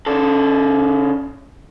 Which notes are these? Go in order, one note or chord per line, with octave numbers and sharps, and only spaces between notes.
C#3 A4